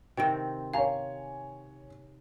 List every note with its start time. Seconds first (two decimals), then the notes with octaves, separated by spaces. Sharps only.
0.17 C3 D#3 C4 G5 D7
0.74 C#5 F5 G#5 A#5